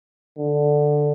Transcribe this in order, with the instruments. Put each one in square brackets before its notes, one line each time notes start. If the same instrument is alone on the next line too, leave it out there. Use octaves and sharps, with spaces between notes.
[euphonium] D3